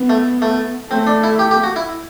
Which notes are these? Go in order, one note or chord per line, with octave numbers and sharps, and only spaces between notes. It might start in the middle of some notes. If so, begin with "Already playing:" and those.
Already playing: B3
A3
A3
A3 C4
D4
E4
G4
G4
F#4
E4